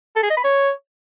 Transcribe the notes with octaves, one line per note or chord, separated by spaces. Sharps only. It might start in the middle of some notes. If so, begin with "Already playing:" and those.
A4
G#4
D#5
B5
C#5